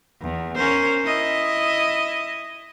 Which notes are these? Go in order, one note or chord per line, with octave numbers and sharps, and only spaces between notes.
E2
C#4 A#4 C5
E4 D#5